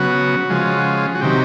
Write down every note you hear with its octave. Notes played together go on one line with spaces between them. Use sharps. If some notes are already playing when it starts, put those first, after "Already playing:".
Already playing: C#3 F#3 B3 F#4
C#3 F3 G#3
F#4
C3 D#3 F#3 G4